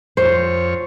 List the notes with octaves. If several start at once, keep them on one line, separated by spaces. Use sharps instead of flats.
F2 C5 C#5